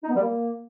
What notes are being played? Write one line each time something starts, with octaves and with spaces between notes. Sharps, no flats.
D#4
B3
G3
A#3